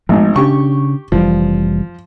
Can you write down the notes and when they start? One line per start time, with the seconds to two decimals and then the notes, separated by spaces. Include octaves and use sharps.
0.09 G#1 G#2 F3 A3 B3
0.36 C#3 C#4 D4 G4 C#6
1.12 F1 E3 F3 G3